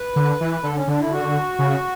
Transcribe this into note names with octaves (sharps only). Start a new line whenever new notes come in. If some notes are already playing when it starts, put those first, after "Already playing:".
Already playing: B4
D3
E3
D3 A4
C#4
D3 D4
E4
F#4
C#3